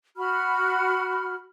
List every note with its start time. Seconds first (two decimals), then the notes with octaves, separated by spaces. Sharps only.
0.17 F#4 B5 F6